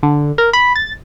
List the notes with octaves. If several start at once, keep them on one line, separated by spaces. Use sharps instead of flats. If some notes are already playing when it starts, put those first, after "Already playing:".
D3
A#4
B5
A6